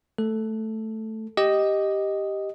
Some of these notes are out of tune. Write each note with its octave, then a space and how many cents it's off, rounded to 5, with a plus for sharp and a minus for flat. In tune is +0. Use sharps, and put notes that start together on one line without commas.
A3 +0 A4 +0
G4 +0 D#5 +0